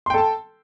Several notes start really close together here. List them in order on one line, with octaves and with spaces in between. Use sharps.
C6 G5 A4 A5